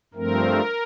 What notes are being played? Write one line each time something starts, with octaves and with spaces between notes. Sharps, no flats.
G2 F3 A3 C4 A#4